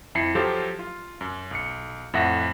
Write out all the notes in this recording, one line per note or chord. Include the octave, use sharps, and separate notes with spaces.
F2 E4 B5 C7 C#7
F3 F#3 G4 A4 C5 F5
F4
F#2
B1 C#7
F2 A2 E5 F#5 A#6